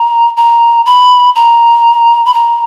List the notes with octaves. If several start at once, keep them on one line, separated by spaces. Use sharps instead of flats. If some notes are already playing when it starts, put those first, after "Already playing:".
Already playing: A#5
A#5
B5
A#5
B5
A#5